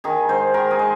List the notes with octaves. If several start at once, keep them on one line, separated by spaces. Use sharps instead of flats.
D#3 G#4
G#2 C5
D#3 A#4
G#4
G#3